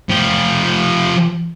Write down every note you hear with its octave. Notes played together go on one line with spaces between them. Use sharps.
F3 G4